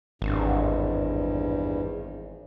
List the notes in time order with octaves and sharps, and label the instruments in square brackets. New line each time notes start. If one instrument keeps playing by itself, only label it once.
[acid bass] G#1 [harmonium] E2 G2